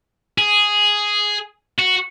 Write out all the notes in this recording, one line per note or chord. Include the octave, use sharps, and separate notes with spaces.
G#4
F#4